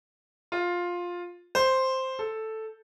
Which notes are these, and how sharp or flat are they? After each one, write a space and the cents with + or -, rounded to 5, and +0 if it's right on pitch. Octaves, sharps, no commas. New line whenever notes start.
F4 +10
C5 +0
A4 +0